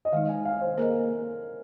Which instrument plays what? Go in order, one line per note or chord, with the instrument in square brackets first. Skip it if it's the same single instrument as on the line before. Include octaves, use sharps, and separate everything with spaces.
[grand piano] D#5
[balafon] D#3 G#3 D#4 [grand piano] F5
[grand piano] G#5
F5
C5
[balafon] A#3 G#4 D#5 [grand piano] A#4